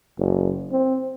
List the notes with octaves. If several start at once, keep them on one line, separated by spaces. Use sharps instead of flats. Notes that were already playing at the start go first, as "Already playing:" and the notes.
F#1
C4